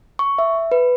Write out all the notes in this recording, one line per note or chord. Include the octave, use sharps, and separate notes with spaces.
C#6
E5
B4